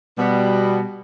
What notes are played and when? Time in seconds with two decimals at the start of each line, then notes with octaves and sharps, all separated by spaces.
0.17 B2 G3 B3